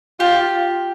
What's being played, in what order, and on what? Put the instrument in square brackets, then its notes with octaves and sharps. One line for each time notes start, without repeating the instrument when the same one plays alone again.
[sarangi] F4 [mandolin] G4